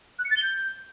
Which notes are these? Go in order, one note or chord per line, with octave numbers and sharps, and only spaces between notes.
F#6
C#7
A6
G7
G6